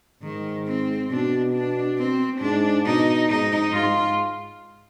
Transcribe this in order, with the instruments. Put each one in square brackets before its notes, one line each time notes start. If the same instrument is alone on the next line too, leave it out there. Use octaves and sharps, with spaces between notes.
[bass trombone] G#2 [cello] D#3
[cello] C4
[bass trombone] B2 [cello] D4
[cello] D4
C4
[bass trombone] G#2 [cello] D4
[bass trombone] B2 [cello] D#4
[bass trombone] G#2 [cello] D#4
[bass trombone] G#2 [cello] F4